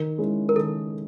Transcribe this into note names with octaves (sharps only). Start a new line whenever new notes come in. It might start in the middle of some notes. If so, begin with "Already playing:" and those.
Already playing: D#3 A#4
G#3 C#4 E4
A#4
D#3 A4